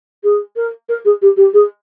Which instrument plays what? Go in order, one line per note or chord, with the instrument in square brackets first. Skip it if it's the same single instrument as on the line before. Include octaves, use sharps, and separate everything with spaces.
[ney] G#4
A#4
A#4
G#4
G4
G4
G#4